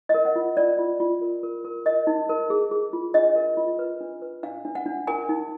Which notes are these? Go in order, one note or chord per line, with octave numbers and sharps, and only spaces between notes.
D#5
A#4
F#5
F4
F4 D5
F4
F4
A#4
A#4
A#4
A#4 D#5
D#4
A#4
G#4
G#4
F4
D4 D#5
A#4
F4
B4
D4
B4
D4 F5
D4
F#5
D4
A#4 G#5
D#4